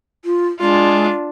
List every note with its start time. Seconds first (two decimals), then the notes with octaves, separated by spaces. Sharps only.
0.25 F4
0.60 G#3 D4 F4